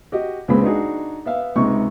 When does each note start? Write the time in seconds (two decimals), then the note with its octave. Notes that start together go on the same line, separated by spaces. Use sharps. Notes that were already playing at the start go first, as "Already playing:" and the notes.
0.12 F#4 G4 D#5
0.48 C#2 C#3 G#3 B3 C4 B5
0.63 D4 D#4 F#4 G#4
1.25 B3 E5 F5
1.56 C#2 C3 G#3 D#4 C#6